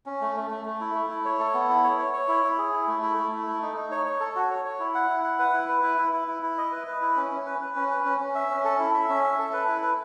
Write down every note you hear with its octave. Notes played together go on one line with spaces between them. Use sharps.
C#4
A3
A3
A3
A3
E4
A3
E4
C#5
A4
B3
E4
C#5
C#5
C#5
E4
E4
G#4
E4
A3
E4
A3
E4
A3
D#4
D#4
C#5
C#5
A4
F#4
C#5
C#5
E4
F#5
E4
F#5
B4
E4
B4
E4
E4
E4
E4
E4
D#5
B4
B4
E4
C#4
C#4
B4
B4
C#4
B4
C#4
C#4
E5
C#4
A4
E4
E5
C#4
E5
A4
B4
E4
B4